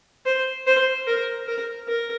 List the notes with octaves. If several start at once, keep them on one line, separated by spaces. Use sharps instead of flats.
C5
C5
A#4
A#4
A#4